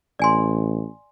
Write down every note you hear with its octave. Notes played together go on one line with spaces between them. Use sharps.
A1 D5 G#5 C6